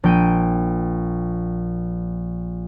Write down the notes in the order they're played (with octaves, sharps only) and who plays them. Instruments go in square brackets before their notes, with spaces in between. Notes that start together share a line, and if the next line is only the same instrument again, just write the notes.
[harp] A#1 G5 D#7